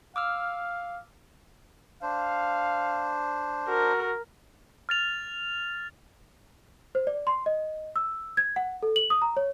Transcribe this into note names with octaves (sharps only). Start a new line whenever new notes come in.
F5 D6 E6 F6
D4 C5 F5
F#4 A#4
F6 A6 F7
C5
D5
C6
D#5
E6
G#6
F#5
A4
F#7
D#6
A#5
C#5